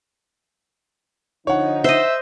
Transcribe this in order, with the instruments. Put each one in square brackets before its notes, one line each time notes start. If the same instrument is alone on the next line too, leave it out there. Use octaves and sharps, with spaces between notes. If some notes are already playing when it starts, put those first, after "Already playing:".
[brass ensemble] D3 F3 D#4 [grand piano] C#5 F#5
[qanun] C5 D#5 [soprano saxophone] E5